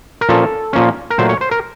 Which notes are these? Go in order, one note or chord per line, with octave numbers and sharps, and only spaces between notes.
A#4
A#2 F3 A#3 C#4 A4
A#2 F3 A#3 C#4
A#4
A#2 F#3 A3 C5
C#5
C5
A#4